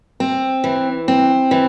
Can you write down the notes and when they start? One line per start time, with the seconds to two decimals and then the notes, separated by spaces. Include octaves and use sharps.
0.20 C4
0.64 E3
1.08 C4
1.51 E3